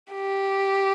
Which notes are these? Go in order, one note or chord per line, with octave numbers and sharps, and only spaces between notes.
G4